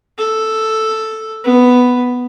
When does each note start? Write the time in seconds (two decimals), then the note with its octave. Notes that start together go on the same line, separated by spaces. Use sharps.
0.18 A4
1.44 B3